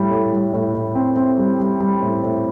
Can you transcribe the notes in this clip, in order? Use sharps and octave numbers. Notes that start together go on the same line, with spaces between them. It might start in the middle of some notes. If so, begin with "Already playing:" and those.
Already playing: A2 G3
A2
G3
A2
A2
C4
C4
G3
G3
G3
A2
A2